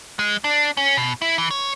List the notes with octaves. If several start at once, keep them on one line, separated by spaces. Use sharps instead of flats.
G#3
D4
C#4
B2
E4
E3
C#5